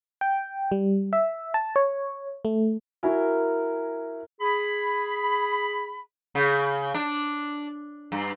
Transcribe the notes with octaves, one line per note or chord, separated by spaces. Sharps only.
G5
G3
E5
A5
C#5
A3
E4 F#4 A#4 G#5
G#4 B5
C#3
D4
G2